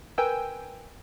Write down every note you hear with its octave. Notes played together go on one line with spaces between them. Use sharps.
A#4 B4 G5 G#5 E6